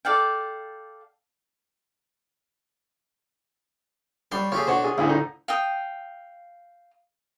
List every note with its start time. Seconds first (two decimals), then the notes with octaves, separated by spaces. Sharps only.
0.05 A4 D5 F5 G5
4.32 G3 C#5 G5 C6
4.52 A3 F4 G4 G#4 C#5
4.67 B2 D4 C5 C#5 F#5
4.84 F4 G#4
4.98 D2 A2 D3 G#4 F5
5.09 D#4
5.48 F5 G5 D#6